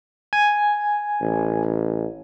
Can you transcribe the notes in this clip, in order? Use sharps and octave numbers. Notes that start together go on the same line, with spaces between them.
G#5
A1